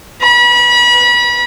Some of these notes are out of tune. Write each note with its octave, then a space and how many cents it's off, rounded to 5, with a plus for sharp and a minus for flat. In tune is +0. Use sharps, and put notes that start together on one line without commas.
B5 -35